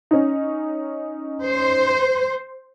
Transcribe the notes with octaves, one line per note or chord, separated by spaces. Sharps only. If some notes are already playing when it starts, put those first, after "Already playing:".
C#4 D#4
C5